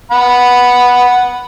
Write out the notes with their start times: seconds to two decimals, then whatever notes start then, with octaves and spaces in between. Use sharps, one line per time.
0.11 F#5 B5